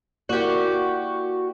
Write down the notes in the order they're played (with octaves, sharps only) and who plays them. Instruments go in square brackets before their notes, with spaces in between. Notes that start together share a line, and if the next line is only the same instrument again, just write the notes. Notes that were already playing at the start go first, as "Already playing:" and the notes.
[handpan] A#3 E4 D5 [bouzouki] F#4 G4